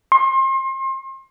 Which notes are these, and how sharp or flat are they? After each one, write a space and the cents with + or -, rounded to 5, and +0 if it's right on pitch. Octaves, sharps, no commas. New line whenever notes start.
C6 +35